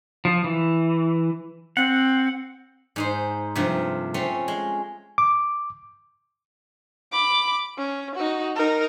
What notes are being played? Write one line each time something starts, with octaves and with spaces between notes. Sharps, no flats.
F3
E3
C4 F#5
G#2 D#4 C5
G2 C3 F3 A3
A3 C4 C#4
G#3
D6
B5 D6
C#4
D#4 F#4
D#4 A#4